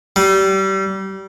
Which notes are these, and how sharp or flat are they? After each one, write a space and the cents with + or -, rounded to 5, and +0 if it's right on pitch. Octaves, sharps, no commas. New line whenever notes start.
G3 -25